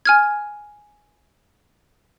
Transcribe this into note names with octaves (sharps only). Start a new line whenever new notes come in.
G#5 F6 G#6